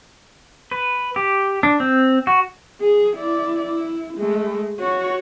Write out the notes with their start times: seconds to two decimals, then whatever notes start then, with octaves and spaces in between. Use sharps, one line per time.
0.71 B4
1.16 G4
1.63 D4
1.80 C4
2.27 F#4
2.81 G#4
3.17 E4 D5
3.65 E4
4.17 G#3 A3
4.80 F#4 C#5